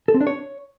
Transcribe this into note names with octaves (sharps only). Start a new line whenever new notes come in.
A4
C4
D4
C#5